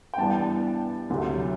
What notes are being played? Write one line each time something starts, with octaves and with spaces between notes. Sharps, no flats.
G5
G2 E3 B3 D4 A5
D2 C3 F#3